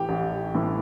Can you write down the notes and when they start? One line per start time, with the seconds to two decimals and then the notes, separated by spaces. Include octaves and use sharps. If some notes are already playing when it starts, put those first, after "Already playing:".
Already playing: A2 E3 G4
0.09 A1
0.55 A2 E3